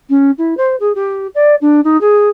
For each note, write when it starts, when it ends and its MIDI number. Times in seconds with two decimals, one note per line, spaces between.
0.09 0.31 61
0.38 0.57 64
0.57 0.76 72
0.80 0.92 68
0.95 1.27 67
1.35 1.55 74
1.61 1.80 62
1.84 1.99 63
2.01 2.29 68